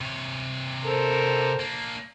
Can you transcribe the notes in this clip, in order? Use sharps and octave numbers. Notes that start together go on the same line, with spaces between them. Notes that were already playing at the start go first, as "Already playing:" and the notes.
C3 C#5
A4 A#4 C5
A#3 D4